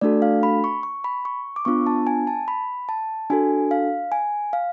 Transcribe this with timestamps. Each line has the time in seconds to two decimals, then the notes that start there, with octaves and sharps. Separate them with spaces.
0.01 A3 D4 F#4 A4 D5
0.22 F5
0.43 B5
0.64 C#6
0.83 C#6
1.04 B5
1.25 C#6
1.56 D6
1.65 B3 D4 F4 C#6
1.87 A5
2.07 G#5
2.27 A5
2.48 B5
2.89 A5
3.30 D4 F#4 A4 G#5
3.71 F5
4.12 G#5
4.53 F5